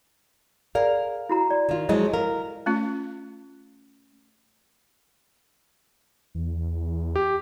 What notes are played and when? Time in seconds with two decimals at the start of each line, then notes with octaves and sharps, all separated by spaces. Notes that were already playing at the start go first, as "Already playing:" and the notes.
0.75 G#4 A#4 D5 F5
1.29 E4 F#4 A#5
1.50 D5
1.69 D#3 F4
1.89 F3 F#3 G#3 E4 D#5
2.13 A#4 F5
2.66 A3 C#4 F4
6.35 E2
7.16 G4